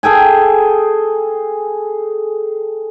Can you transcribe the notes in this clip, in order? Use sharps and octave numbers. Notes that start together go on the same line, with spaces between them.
G#4 A4 G5 G#5